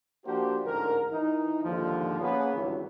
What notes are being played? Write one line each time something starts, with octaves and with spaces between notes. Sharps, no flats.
F3 A#3 D4 F#4 G4 C5
A1 G#2 D3 A#4
E3 D#4
D#2 G#2 D3 F3
A#3 B3 C#4 G#4 B4
G#1 C#2 G2 E3 F#3